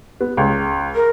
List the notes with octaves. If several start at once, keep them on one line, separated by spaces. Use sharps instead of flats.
B3
C#2
A#4